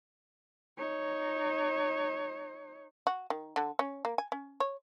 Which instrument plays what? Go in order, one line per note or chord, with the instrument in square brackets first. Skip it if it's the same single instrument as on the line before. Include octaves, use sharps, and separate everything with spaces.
[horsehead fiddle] D#4 C#5
[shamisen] F#4
D#3
D3
C#4
A#3
G#5
C#4
C#5